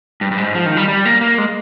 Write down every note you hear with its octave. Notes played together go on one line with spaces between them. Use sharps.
G2
G2
G#2
F3
D#3
G3
G3
A#3
A#3
G#3